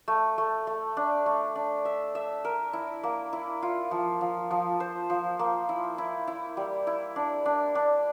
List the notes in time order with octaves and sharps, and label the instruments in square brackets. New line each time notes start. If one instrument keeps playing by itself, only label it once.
[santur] A3
A3
A3
D4
A3
D4
E5
E5
A#4
E4
A#3
E4
F4
F3
F3
F3
C5
F3
A#3
E4
E4
E4
G3
E4
D4
D4
D4